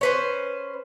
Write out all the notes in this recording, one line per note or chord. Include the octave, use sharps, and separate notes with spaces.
C#4 B4 C5